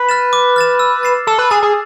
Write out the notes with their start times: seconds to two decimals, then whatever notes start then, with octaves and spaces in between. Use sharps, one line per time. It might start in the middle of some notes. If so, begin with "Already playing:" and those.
Already playing: B4
0.09 F6 A6 E7
0.33 D6
0.56 F6 A6 E7
0.79 E6
1.03 A6 C7 E7
1.27 A4 E6
1.38 B4
1.50 G#4 A6 C7 E7
1.62 G#4